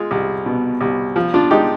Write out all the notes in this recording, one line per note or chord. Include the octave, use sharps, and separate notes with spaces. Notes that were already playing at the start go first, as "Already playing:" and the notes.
Already playing: G#3 F4 G#4
C2
B2
C2
F3
D4 F4
G#3 D#4 G4